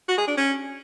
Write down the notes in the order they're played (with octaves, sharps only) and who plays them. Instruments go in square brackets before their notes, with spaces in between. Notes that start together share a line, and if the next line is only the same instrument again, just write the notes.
[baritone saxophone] F#4
G#4
D4
C#4